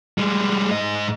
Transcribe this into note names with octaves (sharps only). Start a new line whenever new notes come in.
G3 G#3
G#2 D#5